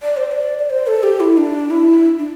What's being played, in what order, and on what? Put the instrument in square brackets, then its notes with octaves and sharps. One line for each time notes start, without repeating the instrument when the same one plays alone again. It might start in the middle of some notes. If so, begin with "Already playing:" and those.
[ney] D5
C5
D5
D5
C5
A4
G4
E4
D4
E4
D4